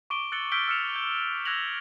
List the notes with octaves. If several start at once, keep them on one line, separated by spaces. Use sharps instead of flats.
C#6 D6 D7 G7
E6 F#6 A6 C#7 F#7 G7
E6 F6 G6 B6 D7 G7
E6 F6 C#7 E7 F7
G6
E6 F#6 G#6 A#6 F7 F#7